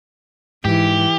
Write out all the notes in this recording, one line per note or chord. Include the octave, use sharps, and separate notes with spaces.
G#2 E3 G4